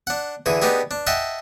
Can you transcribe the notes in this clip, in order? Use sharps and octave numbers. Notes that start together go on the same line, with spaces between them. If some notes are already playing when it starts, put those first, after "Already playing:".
D4 F#5
D3 E3 G#4
B3 D4 D#4 G4 G#4
D4
D#5 E5 F#5 G5 A5